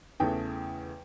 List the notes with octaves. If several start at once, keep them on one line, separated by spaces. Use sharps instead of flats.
E2 C#3 E3 A3 G5